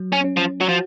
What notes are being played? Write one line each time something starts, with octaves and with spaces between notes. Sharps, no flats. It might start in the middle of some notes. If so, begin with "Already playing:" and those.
Already playing: F#3
C#4
C#4
F3
F#3 F#4
F3